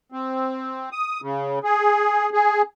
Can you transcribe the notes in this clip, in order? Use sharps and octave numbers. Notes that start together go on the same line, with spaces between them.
C4
D#6
C#3
G#4
G#4